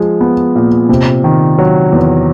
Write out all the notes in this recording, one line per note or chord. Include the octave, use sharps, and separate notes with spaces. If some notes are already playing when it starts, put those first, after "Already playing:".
Already playing: F3 G#3
B3
A#2
C3
D#3
F#3
E2